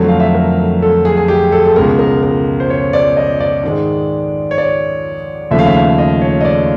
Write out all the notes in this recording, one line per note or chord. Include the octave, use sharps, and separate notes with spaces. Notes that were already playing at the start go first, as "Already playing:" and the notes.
Already playing: F2 D3 F#3 A3
F5
E5
A#4
A4
G#4
G#4
G4
A4
A4
C#2 B2 G#3 A#4
A#4
A#4
C5
C#5
D5
D#5
D5
G#2 D#3 G#3
C#5
D5
D#2 C#3 F3 A3 E5
F5
E5
F5
D#5
C#5
D#5
D5